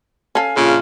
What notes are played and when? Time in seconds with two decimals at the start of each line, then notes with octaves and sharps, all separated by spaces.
0.35 C#4 A4 F5 G#5
0.56 A#1 C#3 F4